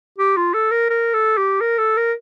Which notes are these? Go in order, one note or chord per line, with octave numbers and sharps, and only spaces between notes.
G4
F4
A4
A#4
A#4
A4
G4
A#4
A4
A#4